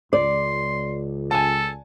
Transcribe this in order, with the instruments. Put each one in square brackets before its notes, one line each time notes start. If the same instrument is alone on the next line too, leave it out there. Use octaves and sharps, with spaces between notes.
[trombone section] C#2 [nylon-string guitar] D5 [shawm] C6
[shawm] A4 [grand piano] G#5 A5